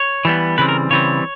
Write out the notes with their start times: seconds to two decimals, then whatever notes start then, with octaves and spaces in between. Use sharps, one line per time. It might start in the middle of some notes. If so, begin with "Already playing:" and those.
Already playing: C#5
0.25 E3 G3 B3
0.58 C#3 E3 G3 C4 B4
0.69 A#4
0.90 C#3 E3 G3 C4 C#5